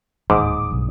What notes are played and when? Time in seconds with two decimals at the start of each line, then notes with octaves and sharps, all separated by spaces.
0.30 D1 G1 D#2 G#2 D6 D#6
0.71 B1 G2